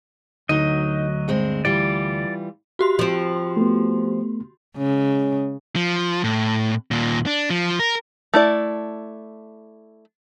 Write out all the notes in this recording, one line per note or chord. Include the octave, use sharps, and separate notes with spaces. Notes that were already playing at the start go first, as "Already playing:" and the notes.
D2 F#3 D#4 D#5
G2 G#3 C4
E3 G3 F4 D5
F#4 G4 C6
F3 C4
A3 B3
C#3 G#3 C#4
F3
A2
D#2 A#2
D4
F3
A#4
A3 E4 D5